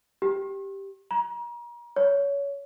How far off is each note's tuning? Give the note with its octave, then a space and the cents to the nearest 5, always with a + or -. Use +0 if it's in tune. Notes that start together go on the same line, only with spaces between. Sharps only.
G4 +0
A#5 +35
C#5 +25